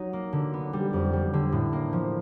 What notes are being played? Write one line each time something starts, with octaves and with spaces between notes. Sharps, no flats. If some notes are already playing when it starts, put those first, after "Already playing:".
Already playing: F#3 D#4
A#3
D3
B3
G3
F2
G3
D3
A2
A#3
F3